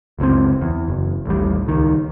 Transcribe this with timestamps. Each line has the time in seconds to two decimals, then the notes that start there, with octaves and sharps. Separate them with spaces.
0.19 F#1 C#2 A#2 C4
0.61 E2
0.88 F#1
1.26 A1 D#2 G3
1.67 C#2 D#3